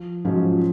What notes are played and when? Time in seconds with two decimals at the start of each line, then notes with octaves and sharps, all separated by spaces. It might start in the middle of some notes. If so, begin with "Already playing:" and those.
Already playing: F3
0.25 G#2 F3 F#3 C#4 F4